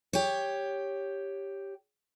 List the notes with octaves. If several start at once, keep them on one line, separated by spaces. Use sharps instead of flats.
G4 C#5